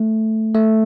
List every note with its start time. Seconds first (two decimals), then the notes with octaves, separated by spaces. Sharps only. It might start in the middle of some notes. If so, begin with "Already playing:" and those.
Already playing: A3
0.55 A3